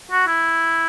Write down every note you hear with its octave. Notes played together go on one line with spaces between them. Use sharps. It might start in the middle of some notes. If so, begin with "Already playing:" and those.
F#4
E4